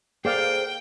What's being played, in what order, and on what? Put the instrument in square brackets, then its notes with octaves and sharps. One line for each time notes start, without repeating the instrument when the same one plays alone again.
[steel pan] A#3 D5 F5 [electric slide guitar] G#4 A4 C5 [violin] G5